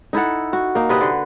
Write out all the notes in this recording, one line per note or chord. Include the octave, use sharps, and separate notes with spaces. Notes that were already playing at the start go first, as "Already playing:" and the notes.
D#4 E4 A4 F#5
F#4
A#3 D#4
C3 B4 D#5
D3